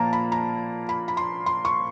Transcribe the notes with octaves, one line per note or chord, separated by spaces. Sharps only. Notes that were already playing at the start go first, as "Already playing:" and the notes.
Already playing: A#2 F3 A#3 A5 A#5
B5
A#5
B5
B5
C6
C6
C#6